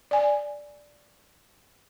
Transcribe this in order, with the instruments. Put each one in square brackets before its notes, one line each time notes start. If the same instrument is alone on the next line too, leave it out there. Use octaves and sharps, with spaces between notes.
[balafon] D5 G#5